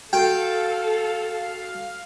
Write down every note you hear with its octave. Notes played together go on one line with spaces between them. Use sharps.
F#4 A4 F5 G5